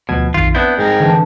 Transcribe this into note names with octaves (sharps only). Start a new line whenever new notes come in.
D2 B2 F3 G#6 D#7
A#1 F2 D#3 F4
B3 C4 D4 E4 G6
G#2 G3 G#4 A#4 G5 A6
D3 E3 G#5